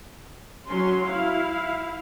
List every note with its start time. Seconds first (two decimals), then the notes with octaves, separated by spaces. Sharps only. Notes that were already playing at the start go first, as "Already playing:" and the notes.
0.68 F#3 C#4 C6
1.06 E4 F5